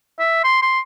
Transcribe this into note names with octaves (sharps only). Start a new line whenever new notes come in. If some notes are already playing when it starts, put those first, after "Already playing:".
E5
C6
C6